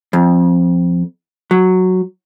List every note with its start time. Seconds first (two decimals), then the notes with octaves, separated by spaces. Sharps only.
0.13 F2
1.51 F#3